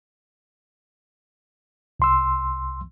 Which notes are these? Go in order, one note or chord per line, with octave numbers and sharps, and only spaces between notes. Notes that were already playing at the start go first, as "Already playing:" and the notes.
C2 C6 E6